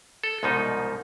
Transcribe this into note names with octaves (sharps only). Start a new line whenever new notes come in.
A4
C2 G#2 B2 F3 D#4